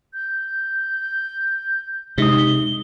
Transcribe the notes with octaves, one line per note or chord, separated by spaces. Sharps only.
G6
C3 G#3 D#4 D#6 G7